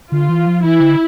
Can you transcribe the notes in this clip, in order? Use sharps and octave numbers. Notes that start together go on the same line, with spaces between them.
D3 F4
E3
F3
E3 E4
D3